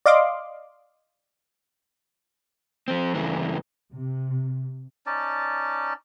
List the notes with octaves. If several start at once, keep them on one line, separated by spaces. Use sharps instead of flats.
D5 D#5 F5 C6 D6
F3 C4
G2 C#3 E3 A3
C3
C#4 D#4 D5 A5